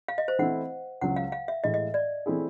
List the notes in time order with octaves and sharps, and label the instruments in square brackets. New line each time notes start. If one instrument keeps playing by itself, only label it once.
[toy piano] F5
D#5
C5
[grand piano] E3 A3 C4 E4 [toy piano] F#5
[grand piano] C#2 C#3 F#3 [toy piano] F#5
[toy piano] F5
F5
E5
[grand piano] A2 E3 G#3 [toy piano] D#5
[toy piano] D#5
D5
[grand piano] E3 A3 C4 E4 G#4